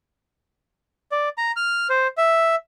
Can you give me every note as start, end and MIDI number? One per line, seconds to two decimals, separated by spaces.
1.12 1.29 74
1.38 1.52 82
1.56 1.88 89
1.90 2.07 72
2.18 2.55 76